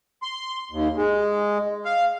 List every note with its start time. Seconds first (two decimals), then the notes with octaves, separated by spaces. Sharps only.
0.22 C6
0.72 D#2
0.96 G#3
1.85 F5